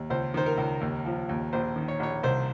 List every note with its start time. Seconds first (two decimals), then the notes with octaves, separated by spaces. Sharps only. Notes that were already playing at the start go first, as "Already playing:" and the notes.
Already playing: D#2
0.10 C#2 C5
0.34 D#3 C5
0.46 A#4
0.58 C#2
0.81 D#2
1.05 F3
1.29 D#2
1.53 A#1 C5
1.76 D#3
1.88 C#5
2.00 A#1 C#5
2.23 C2 C5